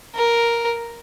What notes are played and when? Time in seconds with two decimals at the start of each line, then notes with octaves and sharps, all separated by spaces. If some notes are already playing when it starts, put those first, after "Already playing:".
0.15 A#4